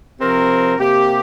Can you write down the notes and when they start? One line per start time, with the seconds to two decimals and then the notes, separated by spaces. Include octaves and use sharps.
0.19 C3 F3 C4 A#4
0.76 C3 A#3 G4